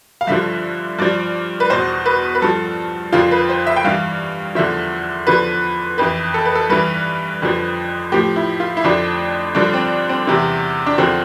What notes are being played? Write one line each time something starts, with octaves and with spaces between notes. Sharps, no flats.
F5
G2 D3 F3 E5
G2 F3 D5
B4
E2 B2 C5
B4
B4
G2 F3 A4
F2 D3 F3 F4
B4
C5
E5
G5
G2 E3 F5
E2 D3 F3 E5
E2 D3 F3 B4
F2 E3 B4
A4
B4
A4
G2 E3 B4
F2 D3 F3
A2 F3 G4
E4
F4
E4
F2 D3 F3 D4
G2 D3 F3 D4
C4
C4
E2 C3 E3
D4
E2 D3 F3 C4